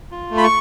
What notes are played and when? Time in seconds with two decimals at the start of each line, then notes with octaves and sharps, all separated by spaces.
0.11 F4
0.31 A3
0.37 B5
0.44 C#6